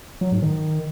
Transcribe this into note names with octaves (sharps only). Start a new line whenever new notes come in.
F#3
G#2
D#3